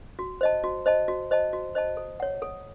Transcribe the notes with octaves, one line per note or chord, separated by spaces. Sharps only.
F#4
C5 D#5 A5
F#4
C5 D#5 A5
F#4
C5 D#5 A5
F#4
C5 D#5 A5
A4
C#5 F#5
A4